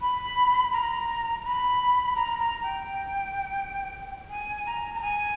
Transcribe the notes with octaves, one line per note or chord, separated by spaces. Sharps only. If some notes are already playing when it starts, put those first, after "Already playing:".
B5
A#5
B5
A#5
A#5
G5
G#5
A#5
A#5
G#5